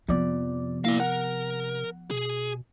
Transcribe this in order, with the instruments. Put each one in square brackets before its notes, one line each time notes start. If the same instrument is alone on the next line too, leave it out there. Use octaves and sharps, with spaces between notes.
[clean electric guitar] F2 D5 [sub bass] C3 [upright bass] F3 B3
[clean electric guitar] A#3 E4 [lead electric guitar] D5 F5
[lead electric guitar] A#4 [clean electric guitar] F#5
[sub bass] B2 [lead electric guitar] G#4